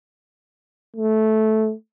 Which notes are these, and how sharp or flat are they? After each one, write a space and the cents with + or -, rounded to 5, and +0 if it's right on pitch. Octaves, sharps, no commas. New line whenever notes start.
A3 -10